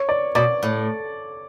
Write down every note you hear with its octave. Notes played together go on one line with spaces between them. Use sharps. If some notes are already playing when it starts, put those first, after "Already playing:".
Already playing: C#5
D5
B2 D5
A2